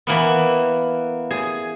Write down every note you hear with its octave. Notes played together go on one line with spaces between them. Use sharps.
E3 A#3 B3
G#4